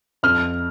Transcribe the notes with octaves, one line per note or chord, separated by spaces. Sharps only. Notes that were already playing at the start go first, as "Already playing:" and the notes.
F2 F6